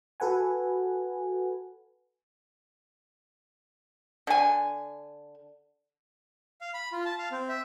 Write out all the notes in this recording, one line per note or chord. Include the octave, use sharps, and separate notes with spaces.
F#4 A4 B4 F#5 G#5
D3 G#5
F5
B5
F4
A5
F5
C4
E5